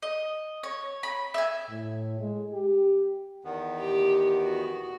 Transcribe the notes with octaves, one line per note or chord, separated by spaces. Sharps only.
D#5
C#5
B5
E5 G#5
A2
G#3
G4
E2 D#3 B3
G4
F#4